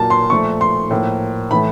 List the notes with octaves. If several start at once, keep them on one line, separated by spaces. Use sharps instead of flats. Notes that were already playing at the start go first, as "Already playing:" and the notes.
Already playing: A#2 F#3 A#3 A5
C6
A#2 F3 A3 C#6
C6
A2 F3 A#3
A2 E3 A3 B5